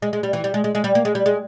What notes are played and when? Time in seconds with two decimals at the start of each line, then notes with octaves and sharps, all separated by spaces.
0.02 G#3
0.13 G#3
0.23 G3
0.33 E3
0.44 G3
0.54 G#3
0.64 G#3
0.75 G#3
0.84 G3
0.95 A#3
1.05 G#3
1.15 G3
1.26 G#3